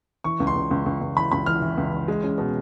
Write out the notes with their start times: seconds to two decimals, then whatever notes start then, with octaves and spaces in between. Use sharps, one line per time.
0.24 E3 C#6
0.40 C#2
0.47 C6
0.55 C#2
0.71 C#2
0.86 C#2
1.01 C#2
1.17 E3 B5
1.32 C#2 B5
1.46 E3 F6
1.62 E3
1.77 C#2
1.93 E3
2.08 G#3
2.24 C#4
2.38 B2